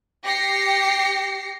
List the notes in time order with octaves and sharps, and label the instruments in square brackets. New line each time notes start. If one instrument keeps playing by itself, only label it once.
[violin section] G4 A#6 C7 C#7